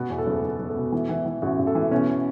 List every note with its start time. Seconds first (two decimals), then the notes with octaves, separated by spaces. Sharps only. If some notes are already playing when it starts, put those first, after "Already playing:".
Already playing: B2 B3
0.10 E2
0.18 A4
0.26 F#1
0.44 F#1
0.59 F#1
0.68 A4
0.76 B2
0.92 E3
1.09 E3
1.26 E3
1.42 A1 F#4
1.59 A1
1.67 A4
1.75 E3
1.91 B2 C#4